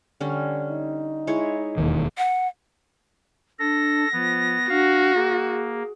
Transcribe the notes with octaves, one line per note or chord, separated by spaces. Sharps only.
D3 G3 C#4
D#4
G#3 E4 C#5
E1 D#2 D#3
F#5
D4 A4 A#6
F3 B3
D4 F#4 F5
A#3 G#4